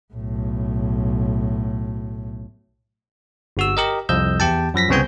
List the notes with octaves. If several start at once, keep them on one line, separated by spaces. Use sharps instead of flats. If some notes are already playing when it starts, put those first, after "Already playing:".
B1 A2
G1 F#4 E6
G4 A#4 D#5
C2 F2 D#5 E6 G6
E2 G4 G5 A5
F#2 F3 A#6 B6
C2 C#3 B3 C4 G#5 G6